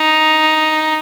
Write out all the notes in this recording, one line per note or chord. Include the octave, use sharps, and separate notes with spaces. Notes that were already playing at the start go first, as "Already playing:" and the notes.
Already playing: D#4